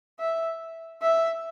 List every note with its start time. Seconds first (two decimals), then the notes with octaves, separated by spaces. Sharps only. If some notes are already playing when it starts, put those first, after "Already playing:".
0.20 E5
1.02 E5